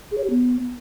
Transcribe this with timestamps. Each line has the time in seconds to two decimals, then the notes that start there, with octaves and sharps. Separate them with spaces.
0.11 G#4
0.18 C#5
0.24 G4
0.30 B3